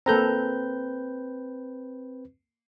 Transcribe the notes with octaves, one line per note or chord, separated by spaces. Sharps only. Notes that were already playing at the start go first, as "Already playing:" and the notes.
A#3 C4 A4 B4 A#5 G6